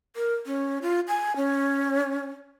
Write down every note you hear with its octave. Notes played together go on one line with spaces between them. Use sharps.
A#4
C#4
F4
G#5
C#4